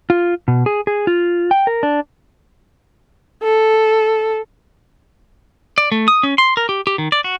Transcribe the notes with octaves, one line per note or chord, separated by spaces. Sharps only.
F4
B2
G#4
G#4
F4
G5
A#4
D4
A4
D5
A3
D#6
C#4
C6
A#4
G4
G4
D#3
D5
F#4